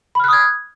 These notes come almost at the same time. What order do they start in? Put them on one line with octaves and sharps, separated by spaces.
B5 F6 F#6 D#6 G#6